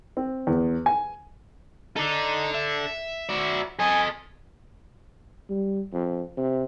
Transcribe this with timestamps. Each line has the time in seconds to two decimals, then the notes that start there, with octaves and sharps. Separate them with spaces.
0.17 C4
0.47 E2
0.86 G#5
1.96 D#4 A4 D5
2.55 E5
3.29 F#4 D5
3.79 A4 D#5 G#5
5.50 G3
5.93 F2
6.37 C3